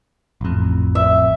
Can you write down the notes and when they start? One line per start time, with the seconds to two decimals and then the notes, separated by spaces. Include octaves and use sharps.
0.41 A1 F2
0.95 E5